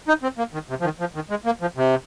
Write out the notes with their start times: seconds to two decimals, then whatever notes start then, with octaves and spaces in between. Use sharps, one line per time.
0.08 D#4
0.23 C4
0.38 A#3
0.54 D#3
0.70 C3
0.81 F3
0.84 D#3
1.00 F3
1.15 D#3
1.30 G#3
1.46 A#3
1.61 F3
1.77 C3